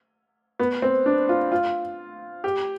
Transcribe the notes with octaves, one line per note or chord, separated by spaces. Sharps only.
B3
C4
D4
F4
F4
G4